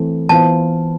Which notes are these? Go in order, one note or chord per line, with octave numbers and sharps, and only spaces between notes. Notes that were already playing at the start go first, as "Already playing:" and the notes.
Already playing: E3 A3 C4
E3 B3 F4 C5 F5 A5